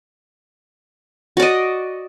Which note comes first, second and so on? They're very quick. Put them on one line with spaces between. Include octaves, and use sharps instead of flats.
F#4 D5 D#5